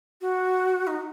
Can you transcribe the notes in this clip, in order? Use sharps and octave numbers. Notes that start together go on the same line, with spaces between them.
F#4
D#4